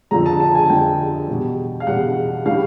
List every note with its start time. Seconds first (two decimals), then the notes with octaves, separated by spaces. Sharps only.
0.11 F2 D3 F3 A#5
0.26 A5
0.40 A5
0.55 G#5
0.70 F2 D3 F3 G5
1.28 E2 B2 G3
1.80 F5
1.87 E2 B2 G3 F#5
2.46 A2 E3 G3 F5